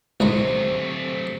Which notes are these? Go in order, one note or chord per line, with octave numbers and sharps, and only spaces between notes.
C#2 G#2 C3 F#3 A3 A#5